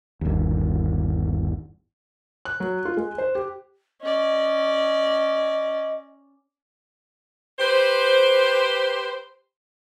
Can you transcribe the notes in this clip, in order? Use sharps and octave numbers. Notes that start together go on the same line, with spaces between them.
G1 D#2
F#6
F#3
F4
G#3
C5
G4
C#4 D5 D#5
G4 B4 C5